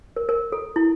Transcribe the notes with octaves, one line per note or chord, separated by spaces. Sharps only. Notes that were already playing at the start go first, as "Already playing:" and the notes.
A#4
A#4
A4
E4